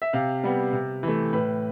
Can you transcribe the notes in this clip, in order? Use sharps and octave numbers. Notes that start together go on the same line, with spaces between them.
E5
C3 F5
G3 B3
C3
E3 A3
A2 B4